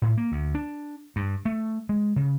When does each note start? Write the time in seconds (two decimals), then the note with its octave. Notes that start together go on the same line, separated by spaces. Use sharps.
0.02 A2
0.17 A#3
0.32 D2
0.55 D4
1.16 G2
1.45 A3
1.89 G#3
2.16 C#3